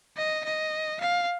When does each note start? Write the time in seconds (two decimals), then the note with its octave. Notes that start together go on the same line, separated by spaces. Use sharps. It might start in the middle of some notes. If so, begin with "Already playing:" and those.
0.17 D#5
0.45 D#5
1.01 F5